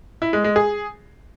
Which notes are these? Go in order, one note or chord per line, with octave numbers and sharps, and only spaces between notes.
E4
G#3
G#3
G#4